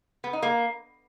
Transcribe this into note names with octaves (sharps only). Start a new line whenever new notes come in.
B3
D#4
A#3